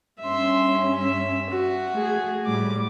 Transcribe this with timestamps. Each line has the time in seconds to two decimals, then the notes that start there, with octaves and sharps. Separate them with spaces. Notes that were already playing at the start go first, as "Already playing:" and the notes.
0.20 G2 C#4 E5 C6
0.94 E5
1.50 F#4
1.93 A3 G#4
2.46 A2 G3 D6